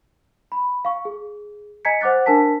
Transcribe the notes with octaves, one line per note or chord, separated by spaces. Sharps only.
B5
F5 C#6
G#4
D#5 G#5 A#5 G#6 B6 C#7
C5 F#5 D6 F#6 A6
D4 A#4 G#5 A5 B6